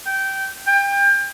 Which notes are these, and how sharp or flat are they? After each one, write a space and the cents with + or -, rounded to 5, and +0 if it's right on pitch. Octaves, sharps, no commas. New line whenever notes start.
G5 -15
G5 +30